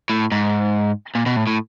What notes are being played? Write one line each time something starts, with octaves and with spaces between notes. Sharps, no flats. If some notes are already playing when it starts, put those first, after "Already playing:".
A2
G#2
A#2
B2
A2
A2